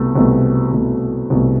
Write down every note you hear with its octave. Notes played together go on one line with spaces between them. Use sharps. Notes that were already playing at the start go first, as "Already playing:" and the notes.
Already playing: C2 B2 A3
C2 B2 A3
C2 B2 A3
C2 B2 A3